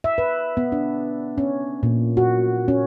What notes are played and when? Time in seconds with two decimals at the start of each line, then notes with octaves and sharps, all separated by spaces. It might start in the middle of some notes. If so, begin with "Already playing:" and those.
0.04 E5
0.18 B4
0.57 B3
0.72 D4
1.38 C#4
1.83 A#2
2.17 F#4
2.68 C#4